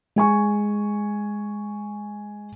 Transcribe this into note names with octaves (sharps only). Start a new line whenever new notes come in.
G#3 G#5 C#6